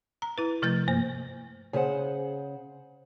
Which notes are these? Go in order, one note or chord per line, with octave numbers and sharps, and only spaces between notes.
A#5
E4 B4
C3 F3 A3 G6 A6
G2 A#3 C5
C#3 G#4 C5 E5 F#5